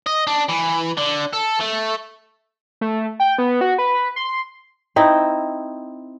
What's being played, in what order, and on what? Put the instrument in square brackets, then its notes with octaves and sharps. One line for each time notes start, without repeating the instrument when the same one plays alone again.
[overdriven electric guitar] D#5
D4
E3
D3
A4
A3
[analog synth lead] A3
G5
B3
F#4
B4
C6
[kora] C4 D#4 E4